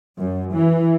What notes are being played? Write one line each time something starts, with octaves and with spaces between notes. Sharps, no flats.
F#2
E3